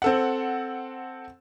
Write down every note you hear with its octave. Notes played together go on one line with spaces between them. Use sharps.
C4 A4 F#5